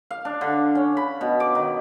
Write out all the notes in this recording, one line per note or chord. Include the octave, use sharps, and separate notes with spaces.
F5
D4
D3
C#4
B5
B2
D6
D#3